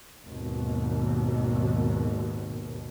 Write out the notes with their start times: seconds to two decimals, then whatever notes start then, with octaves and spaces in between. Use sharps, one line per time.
0.25 G#1 D#2 B2